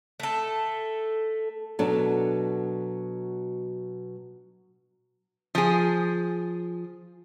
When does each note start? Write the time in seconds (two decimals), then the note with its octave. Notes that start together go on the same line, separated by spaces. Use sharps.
0.20 A3 A4
1.79 B2 F#3 D4 A4
5.55 F3 G#4